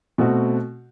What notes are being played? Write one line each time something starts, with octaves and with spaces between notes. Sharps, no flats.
B2 A3 C4 F#4